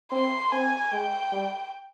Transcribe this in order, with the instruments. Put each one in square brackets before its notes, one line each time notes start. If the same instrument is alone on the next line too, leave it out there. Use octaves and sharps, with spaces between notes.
[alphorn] C4 [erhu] C6
[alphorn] C4 [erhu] G#5
[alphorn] G#3 [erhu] G5
[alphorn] G3